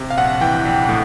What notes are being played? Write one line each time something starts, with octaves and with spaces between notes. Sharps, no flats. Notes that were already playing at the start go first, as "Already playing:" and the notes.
Already playing: C3
F5
A#1 F#5
E3 G5
A#1
A2